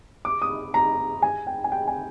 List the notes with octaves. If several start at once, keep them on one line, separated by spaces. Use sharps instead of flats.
D6
D#6
A#5
G#5
G5
G#5
G5
G#5